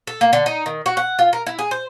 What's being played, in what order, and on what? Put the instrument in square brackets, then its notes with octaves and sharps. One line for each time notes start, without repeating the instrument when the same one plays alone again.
[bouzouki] A4
A#3
D3
D#4
D#3
F#4
F#5
F4
A#4
E4
G#4
C5